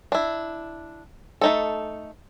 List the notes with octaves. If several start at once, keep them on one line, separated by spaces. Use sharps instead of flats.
D4 E4
A3 D#4 A4